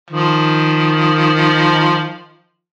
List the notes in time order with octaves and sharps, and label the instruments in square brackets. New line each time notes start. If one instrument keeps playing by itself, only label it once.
[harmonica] D#3 F3